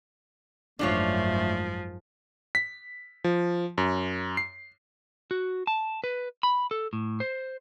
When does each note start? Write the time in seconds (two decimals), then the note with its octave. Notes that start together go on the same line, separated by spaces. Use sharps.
0.79 G#1 F#2 F3 G#3 A3 D4 F4 C#5
2.55 B6
3.24 F3
3.78 F#2
4.37 C7
5.31 F#4
5.67 A5
6.04 B4
6.43 B5
6.71 A4
6.93 A2
7.20 C5